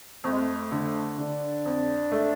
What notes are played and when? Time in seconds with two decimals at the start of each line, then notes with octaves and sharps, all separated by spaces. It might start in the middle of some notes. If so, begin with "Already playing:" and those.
0.24 F2 A3
0.32 G#3
0.38 A3
0.72 D3
1.18 D3 D4
1.65 F2
2.12 A3